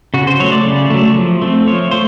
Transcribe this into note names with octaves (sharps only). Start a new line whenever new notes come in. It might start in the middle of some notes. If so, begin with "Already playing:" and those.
C#3 F#4
C5
F#3 A3 C#5
D5
C#3
F#3 A3
F3
A3 C4
F3 C#5
A3 C5